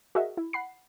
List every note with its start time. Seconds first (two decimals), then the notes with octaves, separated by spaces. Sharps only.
0.15 F#4 G#4 A#4 D#5 E5
0.37 E4
0.53 F#5 B5 C7